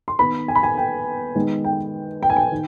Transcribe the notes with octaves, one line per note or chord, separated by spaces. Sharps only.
C6
D#3 B3 B5
G#5
B5
G#5
G5
D#3 G#3 B3
G5
G5
G#5
G5
D#3